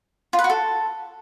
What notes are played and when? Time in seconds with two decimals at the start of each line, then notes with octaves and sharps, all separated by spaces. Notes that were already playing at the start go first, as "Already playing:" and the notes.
0.33 F4
0.39 B4
0.44 F#4
0.50 A4